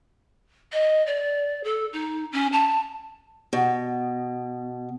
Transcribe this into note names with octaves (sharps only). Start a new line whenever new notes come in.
D#5
D5
A4
D#4
C#4
A5
B2